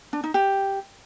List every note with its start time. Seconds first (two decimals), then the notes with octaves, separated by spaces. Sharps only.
0.13 D4
0.24 D#4
0.34 G4